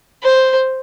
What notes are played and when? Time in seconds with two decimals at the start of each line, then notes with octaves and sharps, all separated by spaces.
0.23 C5